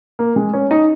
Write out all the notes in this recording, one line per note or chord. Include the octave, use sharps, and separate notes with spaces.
A#3
G#3
C#4
D#4